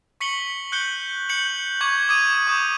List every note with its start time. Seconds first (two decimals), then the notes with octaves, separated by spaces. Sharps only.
0.20 C#6 B6 C#7 F#7 G7
0.72 F#6 G6 C#7 G7
1.29 G6 C#7 F#7
1.81 C#6 D6 G6 G#6 F#7
2.09 D6 D#6 G#6 D#7
2.47 C#6 D#6 G6